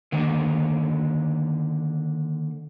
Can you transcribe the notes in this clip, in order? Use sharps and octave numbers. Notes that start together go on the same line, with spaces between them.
D3 D#3 A#3